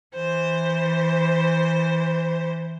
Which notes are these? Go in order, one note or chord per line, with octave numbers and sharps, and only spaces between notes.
E3 C5